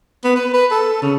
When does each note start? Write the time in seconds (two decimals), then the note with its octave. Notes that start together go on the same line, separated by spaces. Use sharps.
0.24 B3
0.36 B4
0.54 B4
0.71 A4
1.02 C#3